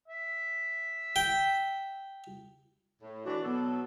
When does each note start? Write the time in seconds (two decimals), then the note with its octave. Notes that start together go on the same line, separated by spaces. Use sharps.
0.08 E5
1.16 G5
3.01 A2
3.26 E3 D4 F#4
3.43 B2 F#3 B3 A4